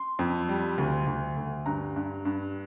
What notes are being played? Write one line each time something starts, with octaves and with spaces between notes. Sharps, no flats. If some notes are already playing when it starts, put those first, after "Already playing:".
Already playing: C6
F2
G3
D2
D2
D2
G2 A#5
G2
G2